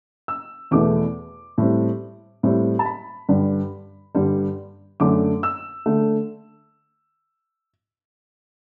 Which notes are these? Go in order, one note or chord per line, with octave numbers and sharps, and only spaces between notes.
E6
E2 B2 A3 E4 D6
A2 G3 C4
A2 G3 C4
A5
B5
G2 D3 G3
G2 D3 G3
F#2 D3 A3 D6
E6
D3 A3